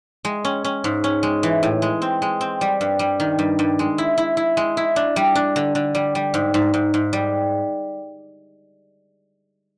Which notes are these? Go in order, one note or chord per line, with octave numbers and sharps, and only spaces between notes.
G#3
C#4
C#4
G#2
C#4
G#3
E3
A2
G#3
C4
G#3
C4
G3
G2
G3
D#3
G2
G2
G#3
E4
E4
E4
G#3
E4
D4
G3
D4
D3
D3
G3
G3
G#2
G#2
G#2
G#2
G3